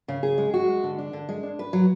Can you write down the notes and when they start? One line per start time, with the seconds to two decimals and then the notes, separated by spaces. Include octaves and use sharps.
0.08 C#3
0.23 G#4
0.38 G#3
0.54 F#4
0.68 G#3
0.84 D3
0.98 D4
1.13 D3
1.29 G#3
1.43 D4
1.59 B4
1.73 F#3